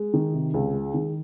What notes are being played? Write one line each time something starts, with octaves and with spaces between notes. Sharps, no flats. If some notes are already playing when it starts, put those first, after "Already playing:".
Already playing: G#3
D#3
C3
C#2
G#3
D#3